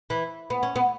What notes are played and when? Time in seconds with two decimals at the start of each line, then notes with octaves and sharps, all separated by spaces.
0.10 E3
0.50 B3
0.63 C#4
0.76 B3